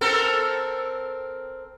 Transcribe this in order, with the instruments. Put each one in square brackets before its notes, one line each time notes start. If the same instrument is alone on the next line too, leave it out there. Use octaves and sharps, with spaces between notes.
[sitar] C4 A4 A#4